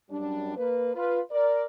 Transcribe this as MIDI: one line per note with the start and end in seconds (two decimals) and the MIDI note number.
0.10 0.55 42
0.10 0.55 55
0.10 0.55 62
0.56 0.91 58
0.56 0.91 71
0.95 1.20 65
0.95 1.20 71
1.31 1.65 70
1.31 1.65 74